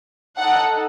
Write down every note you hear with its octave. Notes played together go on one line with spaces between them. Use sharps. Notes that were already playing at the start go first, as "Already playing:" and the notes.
D#4 A4 F#5